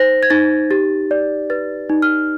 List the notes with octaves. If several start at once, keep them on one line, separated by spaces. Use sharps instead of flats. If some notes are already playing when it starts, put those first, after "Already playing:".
Already playing: D#4 C5 A#6
G#6
D#4 A6
G4 A6
D5
B4 A6
D#4
F6